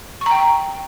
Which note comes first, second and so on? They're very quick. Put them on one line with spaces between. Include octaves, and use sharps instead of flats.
C#6 A#5 G5